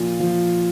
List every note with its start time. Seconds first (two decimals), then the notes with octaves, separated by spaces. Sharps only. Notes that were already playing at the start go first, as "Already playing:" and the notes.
Already playing: A#2 F3 F4
0.20 F3